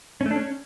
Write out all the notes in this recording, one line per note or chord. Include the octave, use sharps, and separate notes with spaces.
C#4
A3
D4
C#4